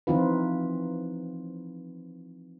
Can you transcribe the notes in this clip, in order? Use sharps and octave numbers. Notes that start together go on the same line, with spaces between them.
E3 F3 C4 D#4 F4 B4